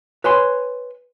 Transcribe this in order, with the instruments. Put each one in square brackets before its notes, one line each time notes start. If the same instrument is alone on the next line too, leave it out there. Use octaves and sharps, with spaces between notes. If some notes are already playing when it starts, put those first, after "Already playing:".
[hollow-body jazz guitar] B4 C#5 G#5 C6